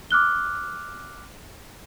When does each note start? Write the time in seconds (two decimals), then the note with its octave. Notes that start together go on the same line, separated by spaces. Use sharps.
0.11 D6 F6 F#6 G7